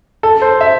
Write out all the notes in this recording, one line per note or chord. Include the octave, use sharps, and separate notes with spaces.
A4
C5
E5